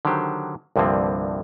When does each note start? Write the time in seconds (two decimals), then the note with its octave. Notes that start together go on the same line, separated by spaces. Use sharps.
0.05 D3 D#3 F#3 G4 C5
0.76 C2 G2 D3 F3 A#3 C4